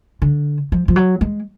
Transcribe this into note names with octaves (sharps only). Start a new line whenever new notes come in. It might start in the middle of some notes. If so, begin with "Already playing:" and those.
D3
F3
F3
F#3
G#3